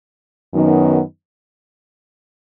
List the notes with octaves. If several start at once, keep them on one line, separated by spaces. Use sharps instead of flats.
F#2 D#3 F#3 B3 D#4